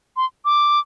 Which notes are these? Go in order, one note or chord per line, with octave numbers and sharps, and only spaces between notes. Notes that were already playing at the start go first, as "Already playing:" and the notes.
C6
D6